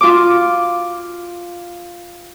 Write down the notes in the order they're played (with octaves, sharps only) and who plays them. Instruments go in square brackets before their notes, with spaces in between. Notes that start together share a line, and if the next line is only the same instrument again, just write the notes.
[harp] F4 D6